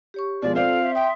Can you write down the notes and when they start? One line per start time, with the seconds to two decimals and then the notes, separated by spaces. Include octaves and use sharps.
0.14 G4 C#5 C#6
0.42 B2 F3 G#3 F4 D5
0.55 C4 A4 C5 D5 F5
0.82 E5 C6
0.95 G5 D#6